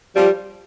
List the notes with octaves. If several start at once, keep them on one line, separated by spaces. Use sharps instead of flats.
F3 G3